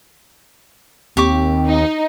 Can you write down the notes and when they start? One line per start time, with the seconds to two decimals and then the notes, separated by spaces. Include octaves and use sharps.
1.17 D#2 C4 G4 C#6 D6
1.66 D#4